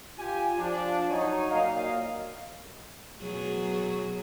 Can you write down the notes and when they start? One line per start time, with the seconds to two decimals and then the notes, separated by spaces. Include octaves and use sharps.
0.18 F4 G4 G#5
0.58 F3 D4
1.10 F#3 D#4 C#5 G#5
1.50 A#2 F#3 A#3 D#5 F5
3.19 B2 F#3 G#4